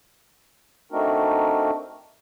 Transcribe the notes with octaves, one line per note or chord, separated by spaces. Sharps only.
A3 C4 D4 D#4 F#4 A#4